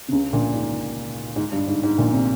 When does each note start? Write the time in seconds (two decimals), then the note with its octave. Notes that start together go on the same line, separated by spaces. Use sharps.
0.08 C3
0.12 C#2 C#3
0.33 A#1 A#2
0.54 G#2
1.36 G#2
1.52 G2
1.67 G#2
1.83 G#2
1.98 A#1 A#2
2.13 C3